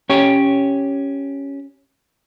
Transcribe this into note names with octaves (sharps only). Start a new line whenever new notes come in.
C#4 G4 C#5